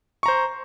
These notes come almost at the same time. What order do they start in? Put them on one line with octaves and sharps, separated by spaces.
C#6 A#5 C5